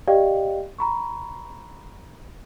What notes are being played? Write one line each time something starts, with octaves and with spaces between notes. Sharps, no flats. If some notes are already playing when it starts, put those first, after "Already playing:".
G4 D5 D#5 F5 G5
A#5 B5 C#6